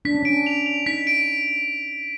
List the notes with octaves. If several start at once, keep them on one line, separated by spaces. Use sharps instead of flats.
D4 B6
C#4
D4 D7
F7
F7
D#4 B6
D7